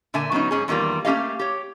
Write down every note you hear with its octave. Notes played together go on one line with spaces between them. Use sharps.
A#2 D3 E5 G#5
F#3 B3 C#4 D#4
G#2 C#4 G#4
E2 D#3 G3 A#3 F4
A3 A#3 C#4 G4 D#5 F5
G4 C#5